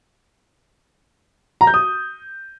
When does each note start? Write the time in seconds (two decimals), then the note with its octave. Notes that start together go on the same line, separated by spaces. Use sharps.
1.61 A#5
1.67 G6
1.74 D#6